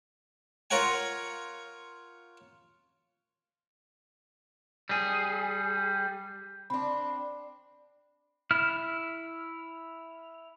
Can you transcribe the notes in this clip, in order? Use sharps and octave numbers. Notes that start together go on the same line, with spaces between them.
F4 A#4 C#5 F#5 G#5
G3 G#4
C4 D4 B5
E4 F6